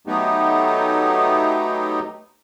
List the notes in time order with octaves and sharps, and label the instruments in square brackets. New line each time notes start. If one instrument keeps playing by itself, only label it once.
[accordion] F#3 A3 B3 D#4 G4